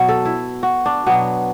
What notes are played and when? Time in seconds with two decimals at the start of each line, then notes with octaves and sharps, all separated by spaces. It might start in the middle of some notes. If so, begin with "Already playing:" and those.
Already playing: B2 F#3 F#4
0.08 A4
0.25 E4
0.63 F#4
0.86 D4
1.06 B2 F#3 B3